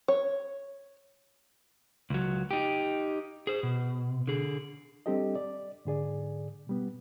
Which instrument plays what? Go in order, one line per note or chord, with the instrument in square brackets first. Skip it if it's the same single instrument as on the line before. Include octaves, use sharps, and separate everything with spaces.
[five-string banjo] C#5
[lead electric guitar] C#2 F#3
D#4 G4
G#4 C5
B2
D3 G#4
[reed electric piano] G3 C4 D4 G4 A4 D#5
D5
G#2 D3 G#4 D5
B2 G3 B3